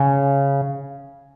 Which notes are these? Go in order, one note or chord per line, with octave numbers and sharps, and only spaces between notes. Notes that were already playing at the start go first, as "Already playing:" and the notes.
Already playing: C#3